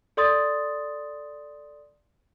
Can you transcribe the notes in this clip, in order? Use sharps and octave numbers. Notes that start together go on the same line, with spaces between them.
A4 D5 C6 D#6 A6